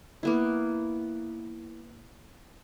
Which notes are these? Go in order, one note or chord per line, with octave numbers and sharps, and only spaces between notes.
A#3 B3 E4